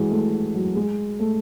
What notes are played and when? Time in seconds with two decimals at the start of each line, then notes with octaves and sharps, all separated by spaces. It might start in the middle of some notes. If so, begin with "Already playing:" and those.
Already playing: E3 F#3 G#3
0.11 A3
0.54 F#3
0.76 G#3
1.19 A3